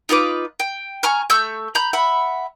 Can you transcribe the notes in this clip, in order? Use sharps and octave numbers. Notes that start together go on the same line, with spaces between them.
D#4 F4 B4 D6
G5
G#5 A#5 C#6 F6
A3 C#6 E6 G6
A#5 B5 G6
E5 F#5 B5